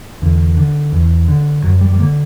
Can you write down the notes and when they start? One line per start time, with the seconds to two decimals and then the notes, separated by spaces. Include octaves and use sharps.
0.22 E2 D3
0.57 D3
0.92 E2
1.28 D3
1.64 F#2 F#3
1.81 G3
1.92 G3
1.99 D3 A#3